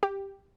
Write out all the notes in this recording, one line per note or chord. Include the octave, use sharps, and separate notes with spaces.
G4